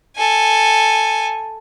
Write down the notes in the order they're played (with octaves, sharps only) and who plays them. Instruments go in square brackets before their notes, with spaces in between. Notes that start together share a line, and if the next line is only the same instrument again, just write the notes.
[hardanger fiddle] A4 G#5